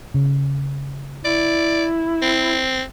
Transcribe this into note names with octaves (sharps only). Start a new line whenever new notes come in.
C#3
E4 D5
C4